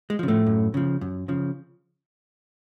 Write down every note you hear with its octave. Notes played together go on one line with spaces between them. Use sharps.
G#3
C#3 F3
A2 A3
F#2
C#3 F3
F#2
C#3 F3